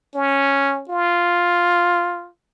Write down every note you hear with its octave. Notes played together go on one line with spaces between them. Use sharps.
C#4
F4